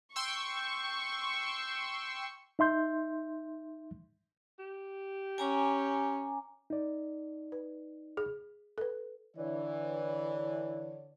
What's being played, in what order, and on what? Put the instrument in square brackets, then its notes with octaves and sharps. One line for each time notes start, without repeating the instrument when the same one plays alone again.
[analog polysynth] G5 C6 E6 [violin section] C#6
[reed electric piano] D#4 E5 C6 G6
[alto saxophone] G4
[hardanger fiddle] C#4 [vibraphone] G#5 A#5 D6
[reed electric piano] D#4 D5
[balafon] B4
G#4
A4 B4
[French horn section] D3 C#5 D5 [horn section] E3